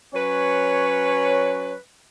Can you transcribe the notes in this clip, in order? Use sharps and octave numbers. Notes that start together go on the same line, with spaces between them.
F#3 C#4 B4 C#5